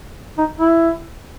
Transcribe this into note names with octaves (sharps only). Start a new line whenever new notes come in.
D#4
E4